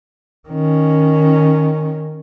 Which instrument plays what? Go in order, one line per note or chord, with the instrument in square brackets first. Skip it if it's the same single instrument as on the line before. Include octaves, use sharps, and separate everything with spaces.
[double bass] D#3 C#4